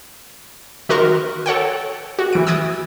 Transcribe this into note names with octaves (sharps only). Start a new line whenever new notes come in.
D#3 F#4 A#4 C6 C#6
A4 C#5 F#5 G5
F#4
E3 D7
D#6 E6 F#6 G#6 A6 D7